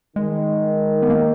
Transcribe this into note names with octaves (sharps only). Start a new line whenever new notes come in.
D#3 G#3
B3
A#3